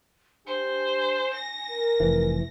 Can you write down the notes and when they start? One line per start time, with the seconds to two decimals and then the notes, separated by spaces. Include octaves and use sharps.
0.47 D4 G4 C5 G#5
1.34 A#6
1.70 A#4
2.00 F1 E3